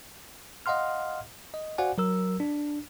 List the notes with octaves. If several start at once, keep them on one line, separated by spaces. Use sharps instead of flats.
D#5 F5 F#5 C6 F6
D#5
F#4 C5 D5 F5 F#5 G#5
F#3 A#4 E6
D4